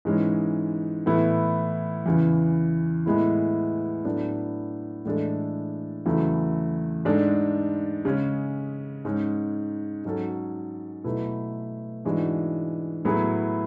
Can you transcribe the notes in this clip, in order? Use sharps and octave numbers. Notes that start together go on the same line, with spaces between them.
G#2 E3 G#3 C#4
A2 E3 B3 E4
E2 C#3 E3
A2 E3 G#3 B3 E4
A2 F#3 B3 D4
A2 E3 G#3 D4 A4
E2 C#3 F#3 A3 E4
G#2 G#3 D4 A4
C#3 G#3 C#4
G#2 G#3 C#4
G#2 F#3 C#4 F#4 A4
B2 F#3 A3 E4 B4
G#2 E3 G#3 D4 F#4
A2 F#3 B3 E4 G#4